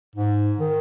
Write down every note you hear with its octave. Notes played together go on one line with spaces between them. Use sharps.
G#2
D#3